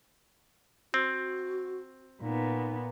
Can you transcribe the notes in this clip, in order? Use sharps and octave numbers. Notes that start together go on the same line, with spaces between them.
C4 F#4
A#2 B3 D#4